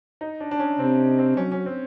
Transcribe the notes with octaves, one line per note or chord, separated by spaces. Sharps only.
D#4
D4
D4
C#4
C3 C4
C4
F#3 C#4
C#4
C4